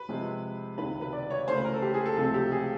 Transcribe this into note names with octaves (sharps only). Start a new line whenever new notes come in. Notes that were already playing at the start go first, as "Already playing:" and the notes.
Already playing: B4
C3 F3 G#3 C4
C#2 C3 D#3 B4
B4
D5
C#5
C#2 C#3 E3 A3 C5
B4
A#4
A4
G4
G#4
A4
C#2 C3 F3 A3 C4 A4
G4
G#4